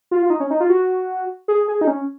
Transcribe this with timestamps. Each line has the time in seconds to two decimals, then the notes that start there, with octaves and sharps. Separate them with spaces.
0.11 F4
0.22 F4
0.30 D#4
0.40 C#4
0.50 D#4
0.60 F4
0.70 F#4
1.48 G#4
1.68 G#4
1.81 D#4
1.87 C#4